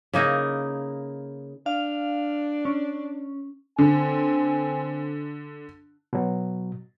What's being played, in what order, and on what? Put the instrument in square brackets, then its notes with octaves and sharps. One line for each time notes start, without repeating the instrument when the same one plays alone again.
[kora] C#3 A#3 D#4 E4
[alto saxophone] D4 [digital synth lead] F5
[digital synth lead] C#4
[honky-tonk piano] D3 [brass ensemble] C4 G#5
[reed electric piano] B2 F#3